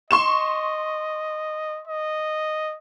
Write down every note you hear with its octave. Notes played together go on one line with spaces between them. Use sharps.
D#5 C6 C#6 E7
D#5